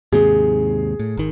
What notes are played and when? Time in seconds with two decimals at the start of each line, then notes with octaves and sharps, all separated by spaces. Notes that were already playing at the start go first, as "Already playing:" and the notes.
0.12 D#2 G#2 C3 G#4
0.99 A2
1.17 G#1 D#3